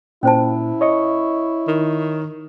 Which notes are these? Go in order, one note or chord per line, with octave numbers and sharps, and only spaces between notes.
A#2 C#4 E4 C5 A5
C#5 D#5 C#6
D#3